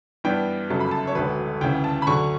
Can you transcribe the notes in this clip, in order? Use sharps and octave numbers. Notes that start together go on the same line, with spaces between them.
G2 E3 B3 D4 G5
G1 F#2 C#3 F#3 A3 A5
B5
A5
C#5
E1 D2 D3 A3 B4
D2 C#3 E3 G5
A5
B5
D2 D3 F#3 C#6